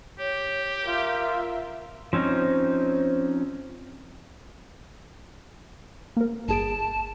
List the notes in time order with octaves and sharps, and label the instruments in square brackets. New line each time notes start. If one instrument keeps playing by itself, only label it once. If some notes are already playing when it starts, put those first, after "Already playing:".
[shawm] G4 [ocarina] C#5
[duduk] F4 [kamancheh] A#4 E5 [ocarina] F5
[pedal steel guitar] F3 C4 C#4 D#4
[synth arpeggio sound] A#3 A#4
[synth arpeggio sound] G1 G#4 D7 [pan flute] A5